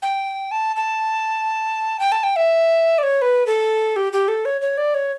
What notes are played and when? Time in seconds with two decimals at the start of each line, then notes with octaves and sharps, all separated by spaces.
0.02 G5
0.51 A5
0.76 A5
2.00 G5
2.12 A5
2.23 G5
2.36 E5
2.98 D5
3.03 C#5
3.22 B4
3.47 A4
3.96 G4
4.13 G4
4.28 A4
4.45 C#5
4.61 C#5
4.78 D5
4.94 C#5